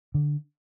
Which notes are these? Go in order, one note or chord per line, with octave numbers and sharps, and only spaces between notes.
D3